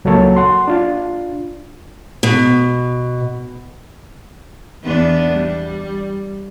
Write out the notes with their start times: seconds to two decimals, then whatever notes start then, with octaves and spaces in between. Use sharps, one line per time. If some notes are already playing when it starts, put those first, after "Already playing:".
0.05 C#2 F#3 A#3 A4 C#5 A5
0.36 F#5 C6
0.68 D4 F4
2.23 B2
4.84 E2 B3 D4
5.33 G3